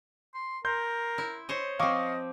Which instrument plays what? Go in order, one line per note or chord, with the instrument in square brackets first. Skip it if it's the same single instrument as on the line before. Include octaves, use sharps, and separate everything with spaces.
[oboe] C6
[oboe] A#4 [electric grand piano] C6 G6
[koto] E4
C5 C#5 D#5
[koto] F3 C4 [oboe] D#5 [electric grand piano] F5 C#6 D6